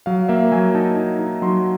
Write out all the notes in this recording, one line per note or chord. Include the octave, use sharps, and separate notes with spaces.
F#3 F5
A#3 E5
F#3 G#5
D#4 A5
D#4
D#4
F#3 C6